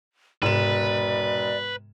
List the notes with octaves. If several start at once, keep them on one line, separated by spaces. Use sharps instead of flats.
E1 G#2 C3 B4 D5 E7